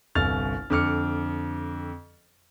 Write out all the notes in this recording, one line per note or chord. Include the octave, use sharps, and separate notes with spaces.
G1 C2 F6 A6 F7
F2 D3 D6 F6 C#7